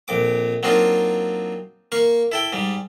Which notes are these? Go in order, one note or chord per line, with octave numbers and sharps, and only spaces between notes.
A#1 F2 D6
F#3 A#3 C4 D4 D#4 F4
A#3 F5 C#6
E4 A4 G5
G#2 G3